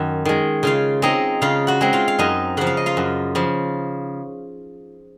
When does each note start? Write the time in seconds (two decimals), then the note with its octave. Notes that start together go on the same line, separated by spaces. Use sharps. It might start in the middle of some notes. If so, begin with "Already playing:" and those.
Already playing: F#2 D#3
0.25 D#3 G#3
0.63 C#3 F4 F5
1.02 G#3 C4 D#4 D#5
1.42 C#3 F4 F5
1.67 F#4 F#5
1.81 G#3 C4
1.93 F4 F5
2.08 F5
2.19 F#2 D#4 D#5
2.57 C#3 F3 F#5
2.67 F5
2.77 D#5
2.86 F4 F5
2.97 F#2
3.35 C#3 F3